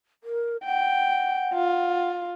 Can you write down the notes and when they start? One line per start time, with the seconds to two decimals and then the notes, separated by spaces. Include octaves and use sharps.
0.24 A#4
0.66 F#5 G5
1.54 F4